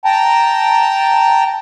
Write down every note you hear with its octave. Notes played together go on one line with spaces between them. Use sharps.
G5 A5 A#5